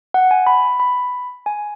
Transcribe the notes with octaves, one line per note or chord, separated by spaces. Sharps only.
F#5
G#5
B5
B5
G#5